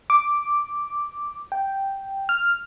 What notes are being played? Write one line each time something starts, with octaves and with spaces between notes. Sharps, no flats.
D6
G5
F6